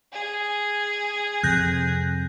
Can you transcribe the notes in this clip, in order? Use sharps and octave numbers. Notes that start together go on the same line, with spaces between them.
G#4
F2 C3 F#6 G6 A#6